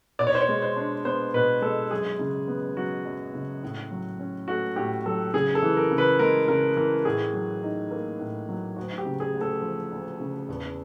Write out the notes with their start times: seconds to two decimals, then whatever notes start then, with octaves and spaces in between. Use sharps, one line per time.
0.19 B2 D5
0.27 C#5
0.35 C5
0.42 C#5
0.49 G#3
0.62 C5
0.77 D4
1.05 B3 C5
1.34 B2 B4
1.62 G#3 A4
1.91 F#2 G#4
2.19 C#3
2.48 B3
2.76 F#3 F#4
3.05 F#2
3.34 C#3
3.63 A2
3.91 F#3
4.19 C#4
4.48 A3 F#4
4.76 A2 G4
5.06 F#3 A4
5.34 C#3 G#4
5.55 A4
5.62 E3
5.77 A#4
5.91 C#3
5.98 B4
6.19 G#3 A#4
6.48 C#3 A#4
6.76 E3 A#4
7.05 A2 G#4
7.33 F#3
7.63 D#4
7.91 A#3
8.19 A2
8.49 F#3
8.76 D2 F#4
8.98 G4
9.05 C#3
9.20 G#4
9.34 D2
9.41 A4
9.62 F3
9.91 D2
10.20 C#3
10.49 E2